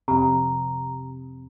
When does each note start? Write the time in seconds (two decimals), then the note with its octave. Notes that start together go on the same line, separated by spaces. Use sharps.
0.08 F2 C3 A#5